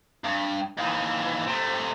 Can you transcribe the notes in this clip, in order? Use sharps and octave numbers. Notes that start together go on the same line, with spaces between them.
G2
D#2 E3
C3 A3